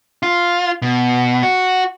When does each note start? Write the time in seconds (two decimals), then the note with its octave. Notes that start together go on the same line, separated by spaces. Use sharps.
0.23 F4
0.82 B2
1.43 F#4